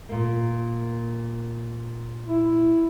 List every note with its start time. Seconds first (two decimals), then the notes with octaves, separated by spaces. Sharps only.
0.09 A#2 A#3
2.27 E4